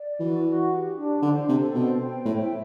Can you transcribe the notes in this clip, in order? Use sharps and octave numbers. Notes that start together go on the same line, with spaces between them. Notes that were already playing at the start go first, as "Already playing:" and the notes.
Already playing: D5
E3 F#4
F#4
G4
D4
D3 C5
C3 A4
B2 C5
G5
A2 E5